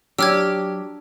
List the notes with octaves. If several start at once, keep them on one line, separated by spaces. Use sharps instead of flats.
F#3 D4 G4 D5 E6 F6 G#6